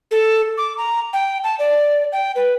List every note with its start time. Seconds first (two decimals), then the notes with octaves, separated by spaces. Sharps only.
0.11 A4
0.57 D6
0.78 A#5
1.13 G5
1.44 A5
1.59 D5
2.12 G5
2.36 B4